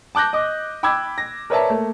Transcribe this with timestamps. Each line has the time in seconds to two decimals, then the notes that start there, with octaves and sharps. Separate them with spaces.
0.15 A5 D6 F#6 G6 A#6
0.33 D#5 D6
0.83 G5 B5 D6 E6 G#6
1.18 A#6
1.50 A#4 B4 C#5 D5 E5 A5
1.70 A3 A#3